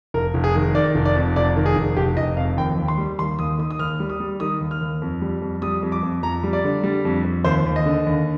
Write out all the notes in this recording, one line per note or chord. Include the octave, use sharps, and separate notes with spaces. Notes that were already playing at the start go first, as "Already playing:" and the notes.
F1 A#4
F1
G#4
D#3
D#3 D5
F1
D5
F2
F1 D5
D#3
G#4
F1
F1 G4
F1 D#5
F2 F5
D#2 G5
D#2
C6
G3
D#2 C6
D#2 D#6
D#3 D#6
D#6
D#2 F6
G3
D#6
G3
D#3 D#6
D#2
F6
D#2
F2
G3
F2
G3 D#6
F2
D6
F2
F2 A#5
G3
D5
D3
G3
F2
F2
D#2 C5
D#2
D#5
D3
D#2